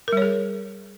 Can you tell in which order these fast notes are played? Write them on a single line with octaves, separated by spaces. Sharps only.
A#4 G3 C#5 G#4